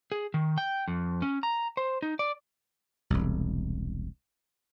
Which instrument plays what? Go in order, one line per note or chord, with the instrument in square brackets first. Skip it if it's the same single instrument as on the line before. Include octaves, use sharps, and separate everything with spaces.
[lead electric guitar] G#4
D#3
G5
F2
C#4
A#5
C5
D#4
D5
[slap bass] E1 C2